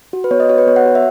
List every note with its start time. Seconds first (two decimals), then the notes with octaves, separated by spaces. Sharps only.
0.13 F#4
0.24 B4
0.31 B3 C#5
0.40 D#5
0.49 F#4 C#5
0.58 B4
0.67 B3 C#5
0.76 F#5
0.86 F#4
0.95 E5